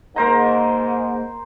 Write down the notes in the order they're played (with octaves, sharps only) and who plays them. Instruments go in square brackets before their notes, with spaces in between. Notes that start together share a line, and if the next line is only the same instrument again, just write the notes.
[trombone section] G#2 [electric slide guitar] A#3 D#5 [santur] A#4 C5 A#5